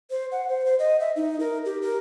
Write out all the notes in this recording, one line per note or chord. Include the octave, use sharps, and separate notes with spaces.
C5
F#5
C5
C5
D#5
E5
D#4
A#4
G4
A#4